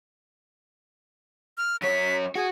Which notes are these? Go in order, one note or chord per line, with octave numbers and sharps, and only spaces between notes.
F6
F#2 C#5 B6
F#4 G#4